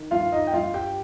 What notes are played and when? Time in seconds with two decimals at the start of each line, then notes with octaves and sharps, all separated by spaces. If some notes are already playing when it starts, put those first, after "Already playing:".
Already playing: D#3
0.11 G2 F4 F5
0.32 D#4 D#5
0.47 G5
0.53 G2 F4 F5
0.74 G4 G5